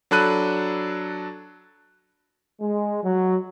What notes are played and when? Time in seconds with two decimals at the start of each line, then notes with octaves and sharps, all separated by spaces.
0.11 F#3 D4 A4 B5 F#6 D#7
2.61 G#3
3.04 F#3